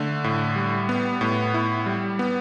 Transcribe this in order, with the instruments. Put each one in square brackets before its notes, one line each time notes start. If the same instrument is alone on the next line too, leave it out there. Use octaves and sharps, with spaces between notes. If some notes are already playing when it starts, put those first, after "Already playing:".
Already playing: [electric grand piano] D3 A3
A2
G3
B3
A2
E4
G3
B3